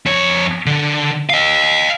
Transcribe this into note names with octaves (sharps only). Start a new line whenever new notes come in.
F2 C#5
D3
D#5 F5